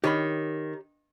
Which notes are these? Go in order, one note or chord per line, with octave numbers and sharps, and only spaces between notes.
D#3 G4 C#5 B5